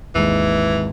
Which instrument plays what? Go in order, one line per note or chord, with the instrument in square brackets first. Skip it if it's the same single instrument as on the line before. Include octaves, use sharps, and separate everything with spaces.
[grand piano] G#1 D#2 G#2 [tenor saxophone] E3